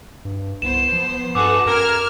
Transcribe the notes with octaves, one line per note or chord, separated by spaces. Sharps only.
G2
C2 B3 C5 E7
F3
G2 A3 F#4 G#4 A4 B4 F#5 D6
F#2 A#4 F6 G#6